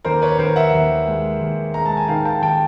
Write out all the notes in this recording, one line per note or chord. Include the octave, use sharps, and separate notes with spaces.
D#2 A#4 C5
B4 C#5
D#2 A#4 C5
E5 F#5
D#2
G#3
D#2
G#3 A#5
A5
G#5
D#3 F5 G5
G5 A5
D#2 G5 A5